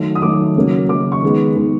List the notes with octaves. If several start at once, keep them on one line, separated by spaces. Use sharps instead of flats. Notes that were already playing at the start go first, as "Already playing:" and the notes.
Already playing: D#3 F#3 A3
D#6
D#3 F#3 A3 D6
C#3 F#3 A#3
C#3 F#3 A#3 D6
C#6
D#3 G#3 B3
D#3 G#3 B3